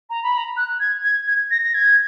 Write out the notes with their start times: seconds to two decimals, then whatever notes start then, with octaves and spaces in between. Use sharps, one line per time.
0.10 A#5
0.23 B5
0.37 A#5
0.57 F#6
0.80 G#6
1.04 G#6
1.27 G#6
1.51 A#6
1.63 A#6
1.74 G#6